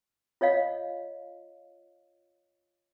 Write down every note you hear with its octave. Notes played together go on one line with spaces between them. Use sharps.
F4 C#5 D#5 F5